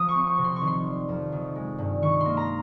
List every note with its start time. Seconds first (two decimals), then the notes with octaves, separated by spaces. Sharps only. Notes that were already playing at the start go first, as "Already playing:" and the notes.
Already playing: F3 D#6
0.09 C#6
0.15 C4
0.27 C#6
0.38 C3
0.44 C6
0.56 C#6
0.61 D#3
0.67 C6
0.85 G3
1.09 F2
1.32 D#3
1.56 G#3
1.78 G2
2.02 D#3 C#6
2.20 A#3 C6
2.37 A#5